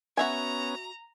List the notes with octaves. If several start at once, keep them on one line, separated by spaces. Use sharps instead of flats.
B3 C#4 F#4 E5 G#5 A#5